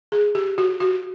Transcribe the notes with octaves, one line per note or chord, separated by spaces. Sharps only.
G#4
G4
F#4
F#4